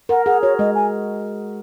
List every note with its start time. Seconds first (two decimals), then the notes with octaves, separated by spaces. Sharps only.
0.09 A#4 F#5
0.26 G#4 F#5
0.42 F#4 C#5
0.59 G#3 D#5
0.75 G#5